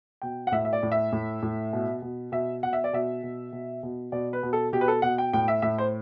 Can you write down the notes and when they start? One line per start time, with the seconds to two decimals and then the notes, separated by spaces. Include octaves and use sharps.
0.22 B2 G5
0.47 F#5
0.52 A2 E5
0.65 E5
0.73 D5
0.83 A2
0.92 E5
1.12 A2
1.42 A2
1.73 B2
2.02 B2
2.32 B2 E5
2.63 B2 F#5
2.73 E5
2.84 D5
2.93 B2 E5
3.23 B2
3.52 B2
3.83 B2
4.12 B2 D5
4.33 B4
4.43 B2
4.53 A4
4.72 B2 G4
4.81 B4
4.88 A4
5.02 B2 F#5
5.18 G5
5.33 A2 G5
5.48 E5
5.62 A2 E5
5.78 C5